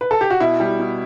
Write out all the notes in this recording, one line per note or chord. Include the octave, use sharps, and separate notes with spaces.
B4
A4
G4
F#4
B2 E4
G3
B2